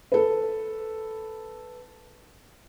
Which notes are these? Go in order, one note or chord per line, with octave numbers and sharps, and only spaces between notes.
A4 B4